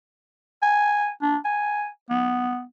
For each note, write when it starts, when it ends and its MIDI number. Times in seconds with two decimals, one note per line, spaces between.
0.62 1.10 80
1.22 1.37 62
1.45 1.88 80
2.10 2.63 59